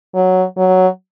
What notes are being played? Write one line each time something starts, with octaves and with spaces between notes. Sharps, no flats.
F#3
F#3